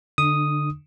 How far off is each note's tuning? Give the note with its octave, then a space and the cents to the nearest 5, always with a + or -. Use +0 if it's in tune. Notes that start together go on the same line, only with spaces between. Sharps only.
D3 +0 D4 +45 D#6 +0